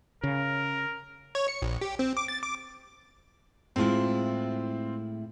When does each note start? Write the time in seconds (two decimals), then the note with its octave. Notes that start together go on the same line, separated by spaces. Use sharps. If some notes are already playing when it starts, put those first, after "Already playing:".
0.23 C#3 A#4
1.35 C#5
1.48 C#7
1.62 A#1
1.81 G4
1.99 C4
2.17 D6
2.28 A6
2.43 D6
3.76 A2 G#3 C4 E4 F4